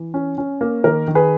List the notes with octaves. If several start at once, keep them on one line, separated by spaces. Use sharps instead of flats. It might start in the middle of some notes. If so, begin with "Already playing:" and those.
Already playing: E3
C#4
C#4
A#3
D#3 A#4
D#3
G#4 B4